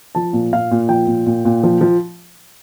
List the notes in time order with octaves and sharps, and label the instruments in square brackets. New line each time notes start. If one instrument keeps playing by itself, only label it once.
[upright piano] F3 A5
A#2
A#2 F5
A#2
F3 G5
A#2
A#2
A#2
F3
F3